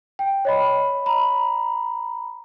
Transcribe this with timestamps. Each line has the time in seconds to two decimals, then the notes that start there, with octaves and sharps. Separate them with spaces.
0.19 G5
0.45 C#5 D#5 B5
1.06 A#5 B5